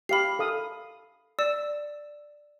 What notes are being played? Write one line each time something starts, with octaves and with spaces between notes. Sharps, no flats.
G4 F5 B5 C7
A4 F5 D#6
D5 E6